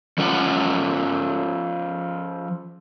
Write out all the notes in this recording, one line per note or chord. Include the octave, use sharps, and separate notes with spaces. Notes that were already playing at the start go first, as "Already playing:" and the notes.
F3 C#4 F4 F#5